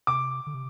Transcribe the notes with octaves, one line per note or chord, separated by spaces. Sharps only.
C3 D6
D3
C3